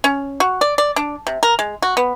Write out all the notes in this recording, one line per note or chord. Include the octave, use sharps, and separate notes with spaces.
C#4
F#4
D5
D5
D4
C3
A#4
G#3
F#4
B3